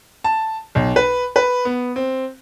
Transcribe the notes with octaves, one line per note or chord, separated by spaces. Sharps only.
A5
B1
B4
B4
B3
C4